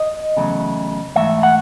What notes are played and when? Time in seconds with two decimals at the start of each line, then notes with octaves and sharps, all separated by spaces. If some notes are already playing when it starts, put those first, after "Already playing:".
Already playing: D#5
0.37 E2 C#3 F#3 A3
1.16 G#2 E3 A3 E5
1.43 F#5